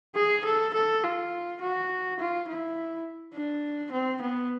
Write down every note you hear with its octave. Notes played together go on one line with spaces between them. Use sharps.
G#4
A4
A4
F4
F#4
F4
E4
D4
C4
B3